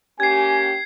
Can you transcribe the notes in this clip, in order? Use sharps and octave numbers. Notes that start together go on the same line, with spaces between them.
A#3 C#4 G4 G#5 G#6 C7